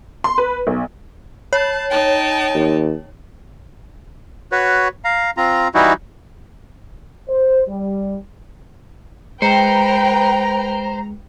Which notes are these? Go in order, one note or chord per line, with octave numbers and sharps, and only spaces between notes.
C6
B4
B1
C#5 A5
D#4 G5 A5
D#2
F#4 B4 C#5
F5 A#5
C4 F4 A#5
E3 G3 D#4 E4 F#4
C5
G3
G#3 B4 C5 G5 A#5 C#7